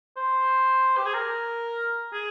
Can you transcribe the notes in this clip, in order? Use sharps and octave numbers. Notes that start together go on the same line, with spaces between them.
C5
G4
G#4
A#4
G#4